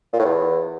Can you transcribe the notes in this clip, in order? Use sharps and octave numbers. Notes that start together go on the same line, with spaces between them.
A#2
A2
E2